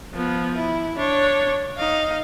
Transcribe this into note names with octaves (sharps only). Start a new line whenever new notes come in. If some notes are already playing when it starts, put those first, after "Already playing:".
F3 B3
E4
D4 C#5
D#4 F5